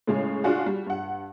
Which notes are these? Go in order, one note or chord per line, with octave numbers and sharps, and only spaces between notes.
A2 C#3 G#3 C#4
D4 F4 F#4 G#4
G3
G2 F#5